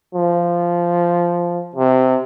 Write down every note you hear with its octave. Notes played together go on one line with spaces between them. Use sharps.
F3
C3